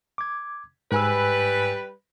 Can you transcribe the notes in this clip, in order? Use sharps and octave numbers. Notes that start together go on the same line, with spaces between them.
D6 G#6
G#2 G3 B4 G#5 E6